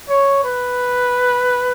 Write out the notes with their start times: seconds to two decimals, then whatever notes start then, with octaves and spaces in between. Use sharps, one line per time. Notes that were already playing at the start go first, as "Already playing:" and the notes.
0.09 C#5
0.44 B4